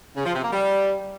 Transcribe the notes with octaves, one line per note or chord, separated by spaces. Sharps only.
C#3
F3
C3
A#3
G3